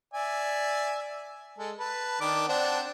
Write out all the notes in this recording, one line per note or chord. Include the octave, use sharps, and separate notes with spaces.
D5 E5 G#5
G#3 A4
B4 A5
D#3 D4 D6
C4 D4 F#5